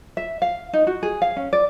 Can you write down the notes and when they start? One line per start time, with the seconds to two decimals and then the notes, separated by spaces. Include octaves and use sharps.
0.17 E5
0.42 F5
0.73 D#4
0.87 F#4
1.03 G#4
1.22 F5
1.36 C#4
1.53 D5